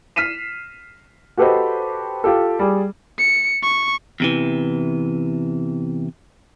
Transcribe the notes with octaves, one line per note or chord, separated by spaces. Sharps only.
F6 B6 C7 D#7 E7
F#4 G4 A4 B4 C5 D#5
F4 G4 A4
G3 G#4
C#7
C#6
E2 C3 E3